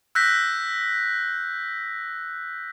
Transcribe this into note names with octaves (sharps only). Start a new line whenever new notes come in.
E6 F#6 G6 A#6 B6